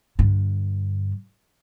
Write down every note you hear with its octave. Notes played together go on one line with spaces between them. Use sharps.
G2 D3